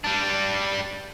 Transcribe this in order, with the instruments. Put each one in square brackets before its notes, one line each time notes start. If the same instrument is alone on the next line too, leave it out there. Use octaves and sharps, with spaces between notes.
[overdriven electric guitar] G3 D4